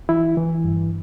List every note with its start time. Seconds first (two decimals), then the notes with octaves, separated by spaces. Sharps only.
0.09 E3 E4
0.37 E3
0.64 G2